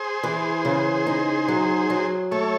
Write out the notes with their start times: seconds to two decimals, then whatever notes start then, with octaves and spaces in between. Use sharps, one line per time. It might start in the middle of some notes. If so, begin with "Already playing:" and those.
Already playing: G#4 C5
0.23 E3
0.65 C#3
1.07 D#4
1.48 F#3
1.90 F#3
2.31 A3 A4 C#5